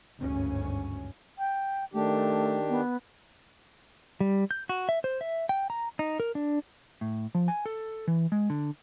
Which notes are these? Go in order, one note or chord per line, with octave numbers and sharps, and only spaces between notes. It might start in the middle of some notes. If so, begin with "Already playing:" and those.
G1 D2 G#2 C#3 C#4
G5
D#3 A3 D4 G4
B3
G3
G6
F#4
E5
C5
E5
G5
A#5
D#4
A#4
D4
A2
F3
G#5
A4
E3
G#3
D3